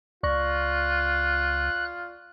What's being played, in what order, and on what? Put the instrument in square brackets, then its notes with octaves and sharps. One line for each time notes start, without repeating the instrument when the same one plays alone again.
[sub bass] C#2 [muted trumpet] F4 [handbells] D5 C#6 A#6 [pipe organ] F#6